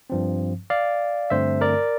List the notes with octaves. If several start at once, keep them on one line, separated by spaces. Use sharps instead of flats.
G2 F3 C4
D5 F5
G2 D3 A3 C4 C5 E5
A#4 D5